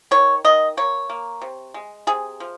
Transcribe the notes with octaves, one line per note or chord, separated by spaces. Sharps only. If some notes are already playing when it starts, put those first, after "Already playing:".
D#3 C#5
D#3 D#5
A#3 C#5
A#3
C3
G#3
C3 G#4
F3